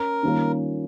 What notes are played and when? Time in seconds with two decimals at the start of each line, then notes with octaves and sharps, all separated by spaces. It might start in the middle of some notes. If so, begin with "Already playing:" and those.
Already playing: C#4 A#4
0.23 D#3 G3 A#3 C#4 F4